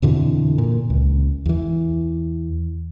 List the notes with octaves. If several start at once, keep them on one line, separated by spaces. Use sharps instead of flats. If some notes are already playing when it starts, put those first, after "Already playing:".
F2 B2 D3 E3
A#2
C#2
E2 E3